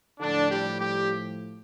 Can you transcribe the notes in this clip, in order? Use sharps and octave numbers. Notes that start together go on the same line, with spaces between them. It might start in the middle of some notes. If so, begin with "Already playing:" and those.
A2 D3 F3 D4
G3 G4
G3 G4